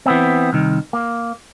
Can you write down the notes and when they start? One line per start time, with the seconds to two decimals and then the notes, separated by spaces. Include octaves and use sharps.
0.06 E3 B3 C4
0.53 C2 D#3
0.93 A#3